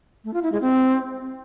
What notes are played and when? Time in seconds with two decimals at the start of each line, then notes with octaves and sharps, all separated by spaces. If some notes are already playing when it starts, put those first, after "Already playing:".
0.24 A3
0.34 F4
0.43 E4
0.52 G#3
0.61 C4